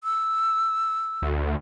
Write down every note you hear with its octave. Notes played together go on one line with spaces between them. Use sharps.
E6
D2